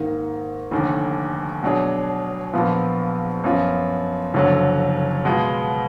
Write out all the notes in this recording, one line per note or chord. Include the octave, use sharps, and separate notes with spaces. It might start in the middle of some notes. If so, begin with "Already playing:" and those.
Already playing: G#2 D#3 A#3
F1 D#2 D3
B2 F#3 D4 G#4
A#1 A#2 F3 B3 F4
F#2 F3 B3 F4
F#1 F2 D3 F#3
B2 G#3 B3 F4